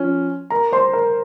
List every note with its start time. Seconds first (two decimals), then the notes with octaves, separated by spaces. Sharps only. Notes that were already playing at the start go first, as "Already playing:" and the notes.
Already playing: F3 C#4
0.50 A#4 A#5
0.72 C5 C6
0.93 A#4 A#5